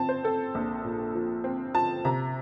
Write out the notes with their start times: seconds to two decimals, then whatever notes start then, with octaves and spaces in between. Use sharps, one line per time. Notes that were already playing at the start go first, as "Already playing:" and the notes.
Already playing: F3 C4 A5
0.09 C5
0.24 C4 A4
0.55 A#1
0.84 A#2
1.15 F3
1.44 C4
1.75 F3 A5
2.05 C3 A#5